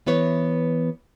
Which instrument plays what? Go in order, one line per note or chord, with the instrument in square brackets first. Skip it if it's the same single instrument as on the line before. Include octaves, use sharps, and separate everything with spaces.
[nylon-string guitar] E3 B3 B4 C#5